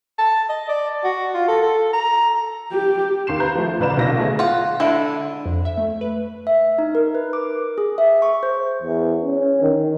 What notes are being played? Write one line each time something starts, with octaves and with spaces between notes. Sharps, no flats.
A5
D#5
D5
F#4
F4
A4
A4
A#5
G4
D#2 C6 C7 E7
B4 A#5 G6
F3 A3
A1 C#3 B4 D5 A#5 E7
B1 A#2 A#6
A3 B3 G#4
F4 F#5
D3 G#3 E4
F2
E5
A3
B4
E5
D#4
A#4
B4
D6
G#4
E5
C#6
C5
E2
C#4
D#3